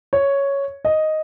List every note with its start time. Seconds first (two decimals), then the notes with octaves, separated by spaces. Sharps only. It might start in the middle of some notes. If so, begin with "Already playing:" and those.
0.13 C#5
0.85 D#5